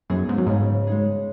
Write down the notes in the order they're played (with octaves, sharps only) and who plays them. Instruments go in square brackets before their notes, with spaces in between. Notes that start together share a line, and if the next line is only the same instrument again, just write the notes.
[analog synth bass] F#2 [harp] B3 D#4 G#4
[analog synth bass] G#2
F#2
[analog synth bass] G#2 [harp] C#3
[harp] G#3 D#4 G#4